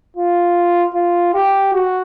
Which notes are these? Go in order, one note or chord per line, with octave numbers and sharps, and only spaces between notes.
F4
F4
G4
F#4